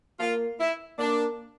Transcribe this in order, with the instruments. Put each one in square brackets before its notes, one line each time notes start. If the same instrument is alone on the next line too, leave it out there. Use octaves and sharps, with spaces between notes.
[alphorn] A#3 [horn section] F4
[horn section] E4
[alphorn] A#3 [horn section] D4